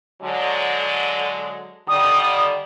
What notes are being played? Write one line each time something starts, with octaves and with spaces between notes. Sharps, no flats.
D3 F#3 G#3
D3 D#3 G3 D#6